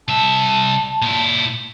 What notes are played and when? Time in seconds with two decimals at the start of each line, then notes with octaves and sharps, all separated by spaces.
0.08 C2 E5 A5
1.02 A#2 E4